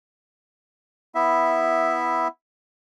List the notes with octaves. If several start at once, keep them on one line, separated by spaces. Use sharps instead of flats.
B3 E4 E5